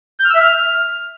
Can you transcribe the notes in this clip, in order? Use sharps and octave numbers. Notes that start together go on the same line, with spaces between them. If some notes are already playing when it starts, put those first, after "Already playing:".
G6
F6
E6
E5
F6